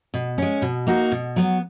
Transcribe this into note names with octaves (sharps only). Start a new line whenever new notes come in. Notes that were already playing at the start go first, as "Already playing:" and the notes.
B2
G#3 C#4
B2
A#3 D#4 F#4
B2
F#3 B3